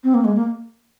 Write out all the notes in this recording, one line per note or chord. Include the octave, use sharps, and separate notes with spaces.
C4
A#3
G#3
A#3